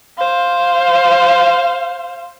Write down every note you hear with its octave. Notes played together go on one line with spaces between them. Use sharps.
C5 F5